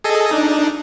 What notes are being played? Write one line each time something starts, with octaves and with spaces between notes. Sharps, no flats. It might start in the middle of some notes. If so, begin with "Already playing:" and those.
G#4 A4 D#5
D4 D#4